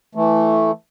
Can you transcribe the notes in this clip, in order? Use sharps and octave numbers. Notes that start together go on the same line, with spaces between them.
E3 A3